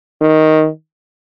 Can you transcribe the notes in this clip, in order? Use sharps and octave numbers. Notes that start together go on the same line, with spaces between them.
D#3